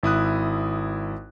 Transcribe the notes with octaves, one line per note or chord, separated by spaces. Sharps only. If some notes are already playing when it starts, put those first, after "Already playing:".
G#1 E4 D#6 F#6